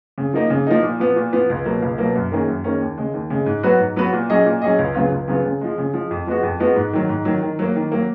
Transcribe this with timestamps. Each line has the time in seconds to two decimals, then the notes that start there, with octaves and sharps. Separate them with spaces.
0.18 C#3
0.33 F3 A#3 D#4
0.50 C#3
0.67 F3 A#3 D#4
0.83 A#2
0.99 F3 B3
1.16 A#2
1.33 F3 B3
1.50 C#2
1.66 B2 F#3 A#3
1.82 C#2
1.98 B2 F#3 A#3
2.15 F#2
2.32 D#3 A#3 C#4 G#4
2.48 F#2
2.64 D#3 A#3 C#4 G#4
2.81 D#2
2.98 C#3 G#3
3.14 D#2
3.30 C#3 G#3
3.46 G#2
3.63 F#3 B3 F#4 B4
3.79 G#2
3.96 F#3 B3 F#4 B4
4.13 A#2
4.30 F#3 C#4 G#4 D#5
4.46 A#2
4.62 F#3 C#4 G#4 D#5
4.79 C#2
4.95 C#3 F#3 B3 F4
5.12 C#2
5.28 C#3 F#3 B3 F4
5.45 C#3
5.61 F3 G#3
5.78 C#3
5.94 F3 G#3
6.11 F2
6.27 F3 G#3 B3 F#4
6.43 F2
6.60 F3 G#3 B3 F#4
6.76 G#2
6.93 D#3 F#3
7.09 G#2
7.25 D#3 F#3
7.42 D#3
7.59 F#3 A#3
7.75 D#3
7.92 F#3 A#3